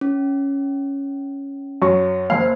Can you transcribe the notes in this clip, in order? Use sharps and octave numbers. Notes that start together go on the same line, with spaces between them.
C#4
F#2 F#3 C#6
F#1 A#3 C5 F5